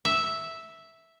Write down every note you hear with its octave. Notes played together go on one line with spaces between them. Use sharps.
E5